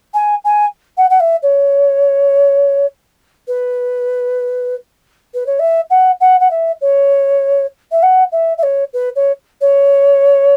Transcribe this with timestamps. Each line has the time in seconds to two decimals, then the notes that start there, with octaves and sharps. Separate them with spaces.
0.14 G#5
0.44 G#5
0.97 F#5
1.10 F#5
1.20 E5
1.42 C#5
3.47 B4
5.34 B4
5.46 C#5
5.59 E5
5.90 F#5
6.20 F#5
6.40 F#5
6.51 E5
6.81 C#5
7.91 E5
8.02 F#5
8.32 E5
8.58 E5
8.63 C#5
8.93 B4
9.16 C#5
9.61 C#5